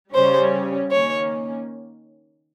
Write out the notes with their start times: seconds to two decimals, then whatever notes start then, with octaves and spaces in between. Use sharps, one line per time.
0.14 C#3 G3 C#4 C5
0.90 D#3 A#3 C#4 C#5